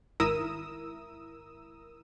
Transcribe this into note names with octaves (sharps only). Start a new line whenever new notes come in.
G#1 E4 A#4 D#6 E6